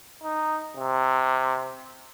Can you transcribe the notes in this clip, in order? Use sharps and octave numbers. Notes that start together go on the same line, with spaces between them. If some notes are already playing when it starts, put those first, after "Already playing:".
D#4
C3